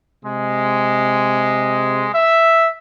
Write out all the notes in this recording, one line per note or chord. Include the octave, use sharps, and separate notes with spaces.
C3 G#3
E5